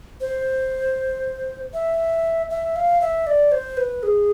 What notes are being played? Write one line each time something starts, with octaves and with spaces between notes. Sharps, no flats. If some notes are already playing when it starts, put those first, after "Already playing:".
C5
E5
E5
F5
E5
D5
C5
B4
G#4